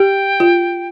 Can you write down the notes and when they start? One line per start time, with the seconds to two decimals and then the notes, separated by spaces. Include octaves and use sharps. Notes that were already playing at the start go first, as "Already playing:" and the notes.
Already playing: G4 G5
0.40 F4